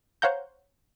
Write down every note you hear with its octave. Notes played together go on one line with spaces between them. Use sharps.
C5 C#5 F5 F#5 A#5 G6